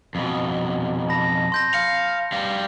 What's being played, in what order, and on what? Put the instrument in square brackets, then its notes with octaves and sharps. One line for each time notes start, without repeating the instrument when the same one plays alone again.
[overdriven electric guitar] F2 B2
[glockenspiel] A5 B5 A#6
C6 G6 A#6
[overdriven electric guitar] F5 [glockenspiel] C#7
[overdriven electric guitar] G3 F5